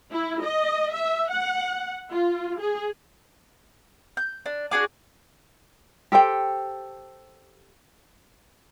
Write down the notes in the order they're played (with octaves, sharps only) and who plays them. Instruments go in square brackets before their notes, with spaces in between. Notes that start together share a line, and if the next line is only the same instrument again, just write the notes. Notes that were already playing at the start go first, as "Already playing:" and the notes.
[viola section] E4
D#5
E5
F#5
F4
G#4
[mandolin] G6
D4
D4 F#4 G#4 D6
[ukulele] G4 A4 C5 G5